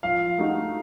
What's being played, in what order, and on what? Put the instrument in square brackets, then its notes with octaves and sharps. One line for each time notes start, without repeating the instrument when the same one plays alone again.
[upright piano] F3 [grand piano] F5
[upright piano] A3 D#4 F#4